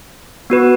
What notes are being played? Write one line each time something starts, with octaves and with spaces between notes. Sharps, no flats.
B3 F#4 B4